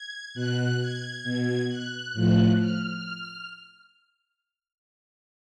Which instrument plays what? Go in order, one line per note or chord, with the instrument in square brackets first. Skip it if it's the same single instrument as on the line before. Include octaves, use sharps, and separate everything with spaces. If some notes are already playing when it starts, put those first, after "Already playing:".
Already playing: [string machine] G#6
B2 F#6
G#6
B2
F#6
A2 F3
F6